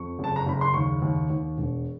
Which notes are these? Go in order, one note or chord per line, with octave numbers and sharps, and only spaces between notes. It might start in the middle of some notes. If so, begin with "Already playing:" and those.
Already playing: F2 C#6
F#1 A5
A#5
F#1 B5
C6
D#2 C#6
D#2
D#2
E1